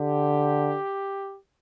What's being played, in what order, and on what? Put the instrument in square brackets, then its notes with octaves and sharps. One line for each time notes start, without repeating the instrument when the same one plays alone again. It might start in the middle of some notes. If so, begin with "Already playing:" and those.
Already playing: [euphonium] D3 [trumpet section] G4